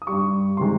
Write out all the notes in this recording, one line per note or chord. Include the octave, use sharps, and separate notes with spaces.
D#6
G2 G3 C#6
C3 D#3 G#3 C6